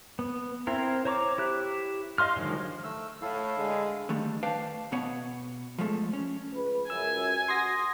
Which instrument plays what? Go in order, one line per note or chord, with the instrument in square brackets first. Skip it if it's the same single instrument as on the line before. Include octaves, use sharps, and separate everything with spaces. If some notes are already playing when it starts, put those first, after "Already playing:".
[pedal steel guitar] B3
C4 E4 A#4
C5 C#5 A#5 C#6 D6
E4 G4 F#6
D#5 F5 C6 F6
D3 D#3 F3 F#3 G#3
[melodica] A3 E6
[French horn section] A2 [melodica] E4 A4 F5
[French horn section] D3 G#3
[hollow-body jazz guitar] D3 D#3 G3 A3
B4 C5 D5 F5 G5 A5
B2 B3 C#5 F#5
F3 G#3 A3 A4
C#4
[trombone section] C#2 B4
[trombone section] C#2 F#2 [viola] G#5 [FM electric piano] E6
[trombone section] F#4 [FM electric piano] C6 D#6 A#6